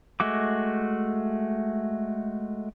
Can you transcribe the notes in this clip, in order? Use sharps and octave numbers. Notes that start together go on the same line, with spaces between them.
G#3 A3 F#4 D6